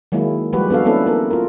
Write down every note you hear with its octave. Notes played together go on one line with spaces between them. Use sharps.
D#3 F#3 G#3 A#3 E4
F3 G3 G#3 F#4 G4 B4
B3 D4 F#4 A4 F5
A#3 B3 C#4 E4 A4 B4
B3 E4 A4 A#4
F4 A#4